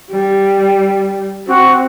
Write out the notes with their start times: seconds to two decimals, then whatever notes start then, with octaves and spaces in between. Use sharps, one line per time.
0.11 G3
1.47 C4 F#4